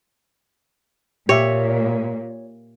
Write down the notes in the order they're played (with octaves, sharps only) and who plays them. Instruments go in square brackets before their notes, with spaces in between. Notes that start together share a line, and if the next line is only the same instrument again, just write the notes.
[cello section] A#2 [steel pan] G4 E5 [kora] C#5